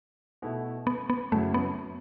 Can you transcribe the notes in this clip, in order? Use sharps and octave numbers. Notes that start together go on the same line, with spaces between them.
B2 A3 E4
B3
B3
F#2 C#3 F#3 A3 C#4 E4
B3